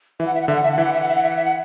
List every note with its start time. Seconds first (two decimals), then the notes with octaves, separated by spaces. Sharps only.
0.20 E3 E5
0.26 F#5
0.35 E5
0.42 F#5
0.48 D3 E5
0.56 F#5
0.63 E5
0.72 F#5
0.78 E3 E5
0.85 F#5
0.94 E5
1.01 F#5
1.08 E5
1.15 F#5
1.23 E5
1.30 F#5
1.37 E5
1.45 F#5